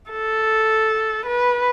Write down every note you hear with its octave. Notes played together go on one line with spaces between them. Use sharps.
A4
B4